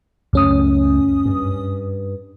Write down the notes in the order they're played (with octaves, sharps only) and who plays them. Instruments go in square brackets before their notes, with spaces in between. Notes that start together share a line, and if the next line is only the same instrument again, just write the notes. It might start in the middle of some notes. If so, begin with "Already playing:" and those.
[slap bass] C#2 A3 [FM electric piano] F#2 C#4 D#6
[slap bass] G2